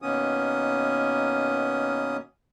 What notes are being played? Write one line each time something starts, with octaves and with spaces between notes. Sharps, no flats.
B2 D#3 A#3 B3 C#4 D#6